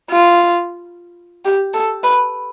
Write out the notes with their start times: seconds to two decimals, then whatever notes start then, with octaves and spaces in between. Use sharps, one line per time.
0.11 F4
1.45 G4
1.74 A4
2.04 B4